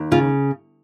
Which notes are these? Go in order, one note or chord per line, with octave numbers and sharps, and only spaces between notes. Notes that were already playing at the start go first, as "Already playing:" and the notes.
Already playing: D#2
C#3 F4